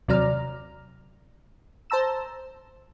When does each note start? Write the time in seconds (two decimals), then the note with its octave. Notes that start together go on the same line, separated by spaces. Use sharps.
0.08 D#2 C3 F#3 D5 A#5 F6
1.90 C5 A5 A#5 E6 E7